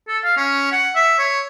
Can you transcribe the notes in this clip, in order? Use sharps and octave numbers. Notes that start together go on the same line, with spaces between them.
A4
F5
C#4
F#5
E5
C#5